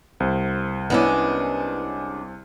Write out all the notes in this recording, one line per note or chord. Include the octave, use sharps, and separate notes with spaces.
C2 C5
G#3 B3 C#4 D4 E4